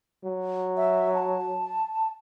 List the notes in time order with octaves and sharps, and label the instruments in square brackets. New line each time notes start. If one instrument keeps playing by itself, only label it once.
[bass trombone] F#3
[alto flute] E5
A5